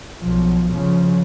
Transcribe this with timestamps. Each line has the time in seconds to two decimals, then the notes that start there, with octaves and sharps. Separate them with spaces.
0.20 B1 F3
0.72 C#3 F3